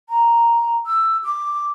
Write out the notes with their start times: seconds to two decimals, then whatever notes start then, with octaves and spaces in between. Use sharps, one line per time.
0.09 A#5
0.86 E6
1.24 D6